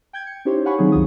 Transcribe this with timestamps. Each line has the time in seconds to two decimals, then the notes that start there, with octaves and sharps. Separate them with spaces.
0.13 G5 G6 G#6
0.27 C#7
0.45 C#4 D#4 E4 G4 C5 C#5
0.65 C#5 F5 F#5 G#5 B5 C#6
0.78 D#3 F#3 G3 C4 D#4 G#4
0.92 C2 F#2 D#3 F4 G#4 D#6